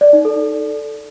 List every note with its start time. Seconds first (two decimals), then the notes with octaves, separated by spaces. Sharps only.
0.01 D5
0.13 D#4
0.25 A4